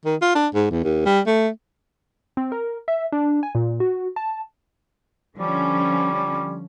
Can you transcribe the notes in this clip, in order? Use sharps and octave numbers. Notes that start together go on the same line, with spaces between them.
D#3
F4
D4
G#2
E2
D#2
G3
A3
C4
A#4
E5
D4
G#5
A#2
F#4
A5
D3 F3 G3 C#4